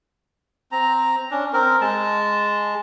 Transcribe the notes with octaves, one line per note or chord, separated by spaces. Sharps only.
C4 A#5
C#4 D4
C4 A#4
G#3 A5